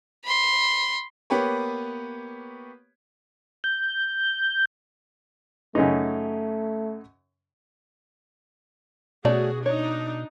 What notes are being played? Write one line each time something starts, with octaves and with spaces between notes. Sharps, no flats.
B5 C6
A#3 B3 G4 B4 C#5
G6
F#2 C#3 A3 D#4
B2 A3 C#4 F#4 G#4 D5
D4 D#4 C#5